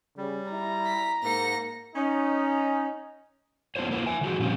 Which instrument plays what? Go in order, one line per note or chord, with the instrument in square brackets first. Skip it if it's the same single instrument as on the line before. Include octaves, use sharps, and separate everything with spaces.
[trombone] C#3 [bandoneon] G3
[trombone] E4 [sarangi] A#5
[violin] B6
[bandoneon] G#2 [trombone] A#3 [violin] A#6 C#7
[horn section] C#4 D#4
[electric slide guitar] B3 D4 F4 C5 C#5
A#3 E4 F4 B4
E5 G#5
D#3 F3 F#4 G#4
A#2 F3 G3 C4 C#4 F4